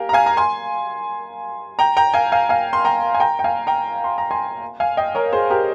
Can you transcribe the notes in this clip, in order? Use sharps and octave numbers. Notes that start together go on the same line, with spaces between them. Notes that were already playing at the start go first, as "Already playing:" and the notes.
Already playing: G4 A#4 F5 G#5
A#5
F5 G#5
A#5
G#5 C6
G5 A#5
G5 A#5
F5 G#5
F5 G#5
F5 G#5
C6
G5 A#5
G#5
G5 A#5
G5
F5 G#5
G5 A#5
C6
A#5
G#5 C6
F5 G#5
D#5 G5
A#4 C#5
G#4 C5
G4 A#4